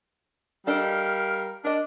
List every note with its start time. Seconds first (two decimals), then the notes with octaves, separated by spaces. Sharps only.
0.67 G3 D4 A4 A#4 D#5 F5
1.65 D4 A#4 D#5